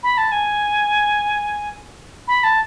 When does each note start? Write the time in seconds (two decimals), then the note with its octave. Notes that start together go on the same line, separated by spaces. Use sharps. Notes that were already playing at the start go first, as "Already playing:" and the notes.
0.03 B5
0.18 A5
0.32 G#5
2.28 B5
2.44 A5